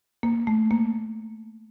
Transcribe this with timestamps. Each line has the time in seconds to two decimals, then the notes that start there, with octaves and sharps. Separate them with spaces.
0.23 A#3
0.47 A3
0.71 A#3